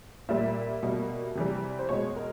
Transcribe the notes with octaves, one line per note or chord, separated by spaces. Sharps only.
A#2 G3 A#3 E5
B2 G3 A#3
C3 E3 G3
C5
B2 G#3 C#5
A#4